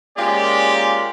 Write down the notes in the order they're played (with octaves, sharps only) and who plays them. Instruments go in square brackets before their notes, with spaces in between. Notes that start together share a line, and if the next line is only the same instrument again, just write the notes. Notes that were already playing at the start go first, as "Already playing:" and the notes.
[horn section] G#3 A#3 C#4 F4 G4 D5